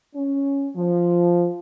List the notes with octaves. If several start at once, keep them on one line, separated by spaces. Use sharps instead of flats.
C#4
F3